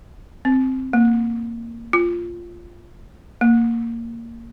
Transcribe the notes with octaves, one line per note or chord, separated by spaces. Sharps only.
C4
A#3
F4
A#3